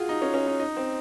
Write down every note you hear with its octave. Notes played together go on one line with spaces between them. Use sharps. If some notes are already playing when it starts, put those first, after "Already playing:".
Already playing: F4 F#4 G#4
D#4
C#4
C#4
D#4
D#4
C4